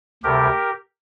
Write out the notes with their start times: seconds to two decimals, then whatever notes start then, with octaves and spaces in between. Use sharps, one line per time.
0.23 D2 C3 G3 G4 A#4